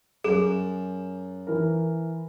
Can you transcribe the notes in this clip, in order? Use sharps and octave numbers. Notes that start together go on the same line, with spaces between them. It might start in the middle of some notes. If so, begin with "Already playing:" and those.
F#2 G#4 E7
E3 A#4